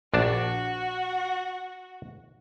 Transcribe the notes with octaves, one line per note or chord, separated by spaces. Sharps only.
A#1 D4 F#4 A5